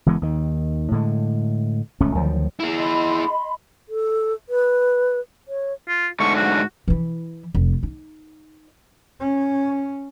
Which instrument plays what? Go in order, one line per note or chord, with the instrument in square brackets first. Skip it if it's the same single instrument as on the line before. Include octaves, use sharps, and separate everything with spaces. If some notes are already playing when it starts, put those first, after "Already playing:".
[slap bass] F#1 E3 G#3 B3
D#2 D#3
A2 D3 G#3
D#1 C#2 A3 C#4
D2 D#3 F3 F#3
[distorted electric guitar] E4 G#4
[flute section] D#5 B5 C6
[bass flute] A4
B4
C#5
[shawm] F4
[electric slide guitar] G#2 D3 A3 [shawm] C#6
[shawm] F#4
[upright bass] E3 E4
F1
D#4
[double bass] C#4